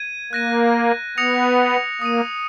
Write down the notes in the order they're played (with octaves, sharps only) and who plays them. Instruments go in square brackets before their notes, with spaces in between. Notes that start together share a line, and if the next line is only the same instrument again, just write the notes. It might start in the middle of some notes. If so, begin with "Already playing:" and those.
Already playing: [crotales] G#6 D#7
[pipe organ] A#3 [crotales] F#6 A#6 D#7
[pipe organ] B3 [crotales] D#6 A#6 C#7 F7
[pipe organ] A#3 [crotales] D#6 A#6 D#7